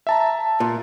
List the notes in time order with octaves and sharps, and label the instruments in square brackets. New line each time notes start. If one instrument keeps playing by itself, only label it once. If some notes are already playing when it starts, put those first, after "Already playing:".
[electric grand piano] E5 A5 A#5
[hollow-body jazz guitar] A#2